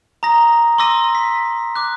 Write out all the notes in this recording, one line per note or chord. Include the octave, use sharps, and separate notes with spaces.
A#5 D#6 A#6
C6 D6 E6 A#6 D#7
B6
D6 F#6